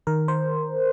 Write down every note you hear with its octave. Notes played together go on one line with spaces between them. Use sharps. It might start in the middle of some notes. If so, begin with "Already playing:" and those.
D#3 A#4
C5